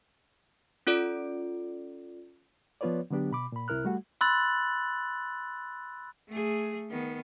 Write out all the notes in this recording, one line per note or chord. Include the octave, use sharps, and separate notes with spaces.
C#4 F4 A4 D5 D7
F3 B3 F4 B4 C#5 D5
D3 F#3 B3 D4 G4
B2 B5 D6
A#2 B5
C2 C3 E4 A#4 F6 F#6
G3 A3 F#4 F#5
B5 C6 E6 F#6 A6 F#7
A3 G#4
D#3 B3